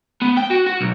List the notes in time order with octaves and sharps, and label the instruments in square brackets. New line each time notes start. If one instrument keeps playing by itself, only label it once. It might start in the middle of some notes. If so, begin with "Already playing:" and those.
[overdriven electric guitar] B3
G5
F#4
F#4
B1